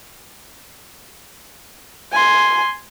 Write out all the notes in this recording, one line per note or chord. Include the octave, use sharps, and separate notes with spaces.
G#5 C6